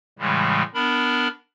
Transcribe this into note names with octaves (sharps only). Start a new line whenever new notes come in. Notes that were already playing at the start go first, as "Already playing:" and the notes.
A2 C#3 E3 G3 G#3
B3 D4 A#4 B5